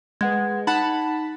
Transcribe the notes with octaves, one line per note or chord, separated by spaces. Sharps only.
G#3 B4 F#5 G#6
D#4 F#5 A5 B5